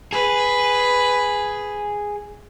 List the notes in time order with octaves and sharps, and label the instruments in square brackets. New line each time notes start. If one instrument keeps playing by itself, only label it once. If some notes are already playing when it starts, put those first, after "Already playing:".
[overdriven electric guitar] G#4 [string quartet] B4